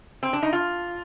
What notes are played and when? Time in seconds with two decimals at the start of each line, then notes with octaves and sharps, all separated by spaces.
0.23 C4
0.33 D4
0.43 D#4
0.53 F4